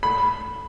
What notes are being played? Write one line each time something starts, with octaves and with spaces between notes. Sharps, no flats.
B5